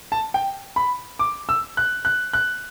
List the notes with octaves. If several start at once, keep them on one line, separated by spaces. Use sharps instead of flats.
A5
G5
B5
D6
E6
F#6
F#6
F#6